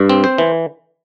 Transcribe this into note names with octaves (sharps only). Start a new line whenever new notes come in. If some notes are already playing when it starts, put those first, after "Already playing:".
Already playing: G2
C4
C5
E3